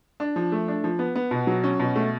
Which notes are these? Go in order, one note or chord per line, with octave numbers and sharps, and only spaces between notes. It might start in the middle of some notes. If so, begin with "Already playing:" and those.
D4
F3
A3
D4
F3
B3
B3
B2
F#3
C#4
B2
A3